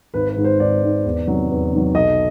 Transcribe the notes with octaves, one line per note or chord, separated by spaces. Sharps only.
G#1 B4
B4
G#2 D#3
C5
G#1 D5
G#2 D#3
E2
C3 D#3 F#3
E2
C3 D#3 F#3
B1 D#5